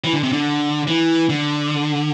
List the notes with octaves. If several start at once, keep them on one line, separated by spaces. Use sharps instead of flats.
E3
D3
C3
D3
E3
D3